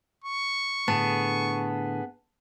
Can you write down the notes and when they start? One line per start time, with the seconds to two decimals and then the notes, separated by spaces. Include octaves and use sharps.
0.24 C#6
0.88 A2 D3 B3 G#4 A5